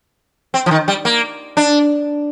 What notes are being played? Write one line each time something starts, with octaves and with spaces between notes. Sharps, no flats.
C4
F3
D#3
G3
A#3
D4